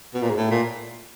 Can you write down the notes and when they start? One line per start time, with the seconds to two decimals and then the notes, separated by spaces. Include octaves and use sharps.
0.14 B2
0.22 A#2
0.30 G#2
0.36 A2
0.51 A#2